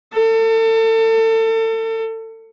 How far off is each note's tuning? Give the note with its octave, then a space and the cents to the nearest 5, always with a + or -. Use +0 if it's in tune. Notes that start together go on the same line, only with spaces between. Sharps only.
A4 +35